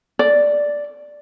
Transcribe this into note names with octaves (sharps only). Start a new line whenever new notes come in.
D5